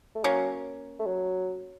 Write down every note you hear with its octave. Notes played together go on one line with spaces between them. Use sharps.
A3
F#3 A#3 C#4
A3
F#3